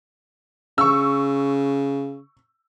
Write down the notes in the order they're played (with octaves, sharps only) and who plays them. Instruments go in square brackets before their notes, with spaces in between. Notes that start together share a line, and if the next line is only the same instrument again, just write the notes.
[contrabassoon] C#3 [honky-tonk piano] C#6 E6